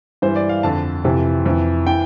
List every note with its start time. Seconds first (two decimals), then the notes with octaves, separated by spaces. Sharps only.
0.22 G2 E3 C5
0.36 D5
0.49 F5
0.63 F2 D3 A5
1.04 F2 C3 E3
1.46 F2 E3
1.87 E3 G5